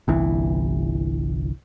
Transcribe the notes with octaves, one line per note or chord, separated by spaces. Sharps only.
G1 C2 E3